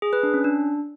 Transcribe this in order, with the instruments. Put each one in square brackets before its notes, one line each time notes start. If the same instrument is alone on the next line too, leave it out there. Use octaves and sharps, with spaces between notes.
[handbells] G#4
B4
D4
C#4
D4